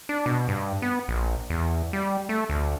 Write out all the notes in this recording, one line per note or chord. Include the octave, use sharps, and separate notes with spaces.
D4
B2
G2
B3
A#1
E2
G3
A3
D2